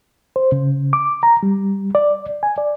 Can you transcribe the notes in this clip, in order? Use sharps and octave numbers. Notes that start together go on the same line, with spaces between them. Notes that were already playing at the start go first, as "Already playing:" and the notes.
C5
C#3
D6
A#5
G3
D5
G#5
D5